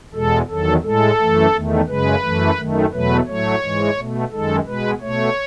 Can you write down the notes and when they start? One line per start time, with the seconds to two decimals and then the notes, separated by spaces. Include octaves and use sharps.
0.14 E2 B2 G#3 A4
0.49 E2 D#3 F#3 A4
0.84 A2 G#3 A4
1.18 F#2 E3 A3
1.53 E2 D#3 A3
1.88 F#2 C#3 G#3 B4
2.23 F#2 E3 A3
2.58 F#2 D#3 A3
2.92 E2 B2 F#3 A3 B4
3.27 A2 F#3 A3 C#5
3.62 G#2 E3 G#3
3.97 B2 A3
4.32 F#2 D#3 G#3 A4
4.66 B2 G#3 B4
5.01 B2 A3 C#5